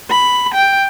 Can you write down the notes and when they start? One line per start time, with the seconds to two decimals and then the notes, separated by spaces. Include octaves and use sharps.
0.11 B5
0.54 G5